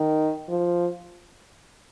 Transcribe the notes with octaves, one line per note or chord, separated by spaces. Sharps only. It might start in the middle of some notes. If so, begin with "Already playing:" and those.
Already playing: D#3
F3